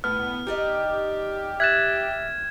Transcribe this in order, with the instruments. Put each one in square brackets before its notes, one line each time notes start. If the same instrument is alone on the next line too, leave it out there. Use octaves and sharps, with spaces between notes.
[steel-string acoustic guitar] A2 [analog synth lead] B3 [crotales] F6
[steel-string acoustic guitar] D#4 D5 D#5 [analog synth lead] G4
[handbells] E5 F#6 A6 [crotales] G#6 E7